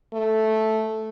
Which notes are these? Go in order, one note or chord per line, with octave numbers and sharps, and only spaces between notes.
A3